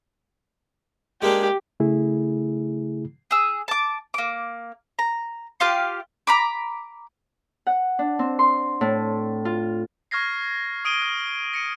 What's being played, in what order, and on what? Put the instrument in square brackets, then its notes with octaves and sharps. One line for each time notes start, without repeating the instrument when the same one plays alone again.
[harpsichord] G#3 A#3 D4 [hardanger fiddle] G4
[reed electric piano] C#3 A3 E4 G#4
[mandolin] G#4 E6
A5 D6
A#3 D6
A#5
F4 G4 F5 C6
A#5 B5 D6
[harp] F#5
D4
C4
C6
A2
F4
[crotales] C#6 F6 G#6 A#6 C7
D#6 D7 D#7 G7
F6
A#6 C#7 D#7